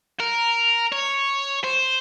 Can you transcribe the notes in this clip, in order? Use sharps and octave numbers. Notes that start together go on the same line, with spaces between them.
A#4
C#5
C5